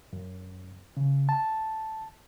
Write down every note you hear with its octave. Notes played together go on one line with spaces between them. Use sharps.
F#2
C#3
A5